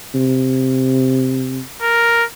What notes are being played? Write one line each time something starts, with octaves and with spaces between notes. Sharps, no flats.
C3
A#4